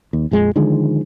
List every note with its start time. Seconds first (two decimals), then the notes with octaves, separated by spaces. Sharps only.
0.13 D#2
0.31 A#1 F2 G#3
0.56 D3 D#3 F3 G#3